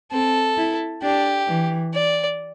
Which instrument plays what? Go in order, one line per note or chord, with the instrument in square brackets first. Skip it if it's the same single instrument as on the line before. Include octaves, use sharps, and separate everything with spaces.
[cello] C4 [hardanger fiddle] A4
[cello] E4
[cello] D4 [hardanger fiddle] G4
[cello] E3
[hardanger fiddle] D5